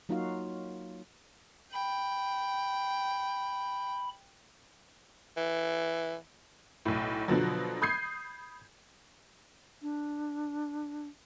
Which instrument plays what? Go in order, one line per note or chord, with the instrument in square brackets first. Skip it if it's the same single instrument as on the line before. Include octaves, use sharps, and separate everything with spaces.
[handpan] F#3 A#3 D#4 F4 F#4 F5
[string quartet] G5 [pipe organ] B5
[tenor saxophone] E3
[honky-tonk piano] B1 A2
B2 D3 F3 F#3
B5 D#6 G6 G#6 C7
[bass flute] D4